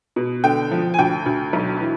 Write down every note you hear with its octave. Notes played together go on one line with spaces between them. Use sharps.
B2
D3 G5
F3
G#5
D2 G5
D2
B1
E3